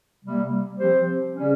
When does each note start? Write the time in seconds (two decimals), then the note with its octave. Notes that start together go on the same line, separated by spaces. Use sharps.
0.24 C3 G3 A#3
0.79 F3 C4 G4 C5
1.35 C#3 G3 C#4